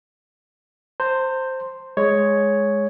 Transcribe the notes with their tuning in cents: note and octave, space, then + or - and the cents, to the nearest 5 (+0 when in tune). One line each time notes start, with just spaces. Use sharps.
C5 +0 A#5 -45
G#3 +0 C#5 +0